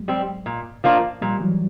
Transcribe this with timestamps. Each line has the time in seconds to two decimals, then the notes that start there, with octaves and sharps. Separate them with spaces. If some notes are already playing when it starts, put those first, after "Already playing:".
Already playing: F#3 G#3
0.08 G3 C4
0.46 A#2
0.84 F3 A#3 D4 F4
1.21 A#2 F3 G3
1.41 E3 F#3